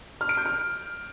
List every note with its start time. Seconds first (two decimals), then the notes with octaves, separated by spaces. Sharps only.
0.21 F6
0.29 D7
0.37 G6
0.46 F6